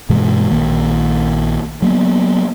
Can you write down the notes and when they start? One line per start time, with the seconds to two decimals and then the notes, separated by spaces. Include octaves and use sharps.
0.09 G2 B2 E3 G#3
0.51 A#1 D#3 A#3
1.82 F#3 A#3 B3